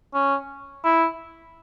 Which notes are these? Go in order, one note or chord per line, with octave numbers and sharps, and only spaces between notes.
C#4
E4